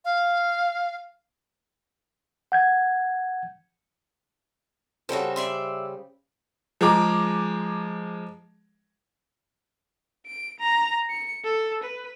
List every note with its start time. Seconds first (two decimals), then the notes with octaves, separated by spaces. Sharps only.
0.05 F5
2.52 F#5 G6 G#6
5.09 C#3 G3 F#4 A4 C5
5.36 D5 E5 C6
6.81 F3 G#3 G#4 A#5 D6
10.26 D7
10.59 A#5
11.10 C#7
11.44 A4
11.83 B4